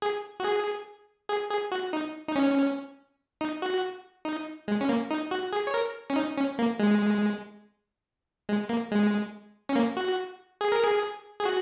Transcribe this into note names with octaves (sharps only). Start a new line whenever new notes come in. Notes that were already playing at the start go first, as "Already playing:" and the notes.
G#4
F#4
G#4
G#4
G#4
F#4
D#4
D#4
C#4
D#4
F#4
D#4
G#3
C#4
A#3
D#4
F#4
G#4
C#5
A#4
C#4
D#4
C#4
A#3
G#3
G#3
A#3
G#3
C#4
A#3
F#4
G#4
A#4
G#4
G#4
F#4